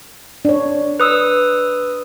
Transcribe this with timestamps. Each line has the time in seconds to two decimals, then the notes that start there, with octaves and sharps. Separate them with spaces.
0.45 D4 C#5
1.00 B4 D#6 E6